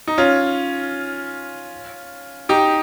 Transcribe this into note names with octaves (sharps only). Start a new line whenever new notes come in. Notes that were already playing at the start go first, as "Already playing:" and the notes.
D#4
C#4 F4
D#4 G4